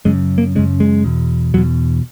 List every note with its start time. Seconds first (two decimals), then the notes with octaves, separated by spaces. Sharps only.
0.05 F#2 C#3 G#3
0.38 A#3
0.55 C#3 G#3
0.59 F#2
0.80 G#3
1.04 E2 B2
1.54 E2 B2 F#3